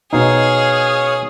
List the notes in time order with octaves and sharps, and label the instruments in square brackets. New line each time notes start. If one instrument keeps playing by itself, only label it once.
[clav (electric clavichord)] B2 D#4 [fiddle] G#4 [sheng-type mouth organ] C#5 F5